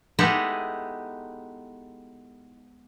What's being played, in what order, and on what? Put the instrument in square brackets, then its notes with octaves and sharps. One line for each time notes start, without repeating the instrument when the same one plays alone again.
[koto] G#3 B3 D#4 E4 G4 A4